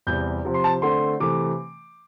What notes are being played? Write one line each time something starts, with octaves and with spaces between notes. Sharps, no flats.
E2 C3 G3 G6
C3 F3 C4
C6
A5
D3 A3 C4 C6
C3 E3 A3 D6